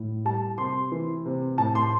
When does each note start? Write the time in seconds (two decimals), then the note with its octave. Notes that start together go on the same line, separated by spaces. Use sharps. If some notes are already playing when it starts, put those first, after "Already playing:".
Already playing: A2
0.25 G3 A5
0.58 C3 C6
0.92 E3
1.26 C3
1.58 A2 A5
1.75 C6